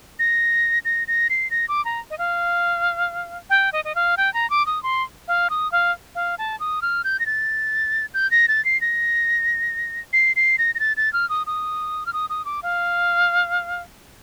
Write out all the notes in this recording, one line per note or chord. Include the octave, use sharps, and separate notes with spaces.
A#6
A#6
A#6
C7
A#6
D6
A#5
D#5
F5
G5
D#5
D#5
F5
G5
A#5
D6
D#6
C6
F5
D#6
F5
F5
A5
D#6
F6
G6
A#6
A6
G6
A#6
A6
C7
A#6
C7
C7
A#6
A#6
A6
A6
F6
D#6
D#6
F6
D#6
D#6
D6
F5